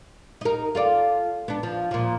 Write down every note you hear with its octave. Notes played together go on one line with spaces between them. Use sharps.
D#4 A#4
F4 A4 D5
B3 D4
F3
A#2 F3